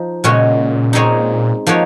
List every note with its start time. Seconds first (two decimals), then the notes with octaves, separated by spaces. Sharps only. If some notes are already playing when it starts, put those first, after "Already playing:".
Already playing: F3 D#4
0.24 A#2 C#3 G#3 C#4 F#4 C#5
0.93 G#3 C4 D#4 G#4 C#5
1.67 F3 A#3 D#4 F#4 C#5